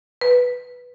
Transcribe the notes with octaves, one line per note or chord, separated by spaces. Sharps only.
B4